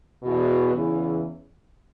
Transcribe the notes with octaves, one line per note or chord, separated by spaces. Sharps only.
E2 B2
E2 C#3 E3